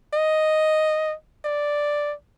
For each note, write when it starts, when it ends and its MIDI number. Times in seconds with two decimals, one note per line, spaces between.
0.13 1.14 75
1.45 2.14 74